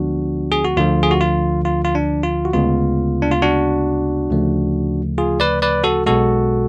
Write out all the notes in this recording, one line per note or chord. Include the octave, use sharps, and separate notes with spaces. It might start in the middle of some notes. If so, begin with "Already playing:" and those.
Already playing: D2 D3 F3 G#3 B3 D4 F#4
G#4
F#4
D2 D3 F3 F4
G#4
F#4
F4
F4
F4
D4
F4
F#4
D2 C#3 G#3 B3 F4
D4
F4
D4 F#4
D2 C#3 F3 A3
F4 G#4
B4 D5
B4 D5
F#4 A4
B1 B2 G#3 F#4 A4